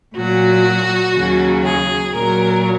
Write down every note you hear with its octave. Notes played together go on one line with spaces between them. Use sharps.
A#2 F#3 F#4
D#2 C#3 F#3
G#4
A#2 F#3 A#4